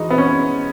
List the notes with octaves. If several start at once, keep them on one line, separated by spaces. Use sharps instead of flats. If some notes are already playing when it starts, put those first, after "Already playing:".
Already playing: E3 G#3 D#4 F#4
B3
C#4